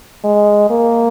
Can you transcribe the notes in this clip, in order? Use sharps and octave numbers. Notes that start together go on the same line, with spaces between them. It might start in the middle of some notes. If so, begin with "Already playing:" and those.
G#3
A#3